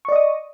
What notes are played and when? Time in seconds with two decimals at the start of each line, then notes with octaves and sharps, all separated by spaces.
0.05 C#6
0.09 D5
0.12 D#5
0.16 D#6